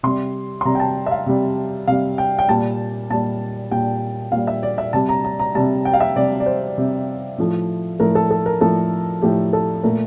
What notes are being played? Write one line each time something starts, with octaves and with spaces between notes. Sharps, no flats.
C3 G3 C6
C6
C3 G3 A#5
G5
A5
E5
F5
C3 G3
C3 G3 F5
G5
G5
A#2 G3 A5
A#2 G3 A5
A#2 G3 G5
A#2 G3 F5
E5
D5
E5
C3 G3 A5
A#5
A#5
A#5
C3 G3 A5
G5
F5
E5
C3 G3 D5
D5
C5
C3 G3
A2 F3 A3
A2 F3 A3 A#4
A4
A4
A#4
A2 F3 A3 A4
A2 F3 A3 G4
A4
A#2 A3 A#4